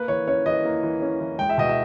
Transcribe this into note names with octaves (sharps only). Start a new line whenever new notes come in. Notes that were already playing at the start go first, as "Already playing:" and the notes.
Already playing: A#3 B4
E3 C#5
C#4 C#5
E3 D#5
A#3
E3
C#4
E3
G#3 G5
E5
B2 D#5
E5